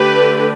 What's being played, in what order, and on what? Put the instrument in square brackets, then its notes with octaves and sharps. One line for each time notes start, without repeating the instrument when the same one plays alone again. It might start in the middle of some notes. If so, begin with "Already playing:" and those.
Already playing: [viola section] D3 A3 D4 G4 B4